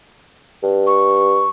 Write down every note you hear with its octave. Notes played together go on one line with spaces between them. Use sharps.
G2
C#6